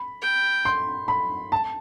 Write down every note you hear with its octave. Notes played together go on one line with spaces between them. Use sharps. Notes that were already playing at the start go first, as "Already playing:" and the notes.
Already playing: B5
G5
C6
B5
A5